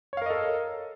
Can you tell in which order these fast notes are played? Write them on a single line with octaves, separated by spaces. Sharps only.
C#5 F5 A#4 D#5 A4